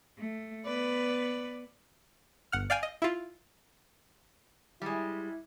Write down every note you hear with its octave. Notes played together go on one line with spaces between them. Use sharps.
A3
B3 B4 D5
G1 F#5 F6
D5 F5 G5 G#5
D#5
E4 F4
G3 G#3 E4